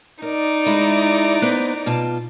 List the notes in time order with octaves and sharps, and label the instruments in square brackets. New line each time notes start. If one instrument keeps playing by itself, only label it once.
[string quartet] D#4 D5 [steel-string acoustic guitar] A#4
[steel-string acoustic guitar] G#3 E4
B3 B4 C5
B2 F4 A5